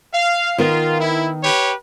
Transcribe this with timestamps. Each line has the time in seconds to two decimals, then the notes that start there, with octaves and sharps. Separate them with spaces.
0.13 F5
0.58 D#3 B3 F4 A#4
1.00 E4
1.43 G4 B4 C#5